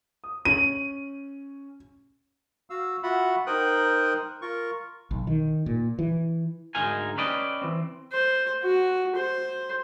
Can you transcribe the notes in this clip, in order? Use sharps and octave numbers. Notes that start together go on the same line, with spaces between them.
D#6
C#4 D#7 F#7
F#4 F5 E6
F4 F#4 E5 F#5 B5
D#4 A#4 C5 G5 D#6 F#6
F4 A#4 C#6
B1
D#3
A#2
E3
D2 G#2 G#3 D#4 A#4 G#5
C#4 G4 B4 D5 D#5
E3 C4
C5
F#4
C5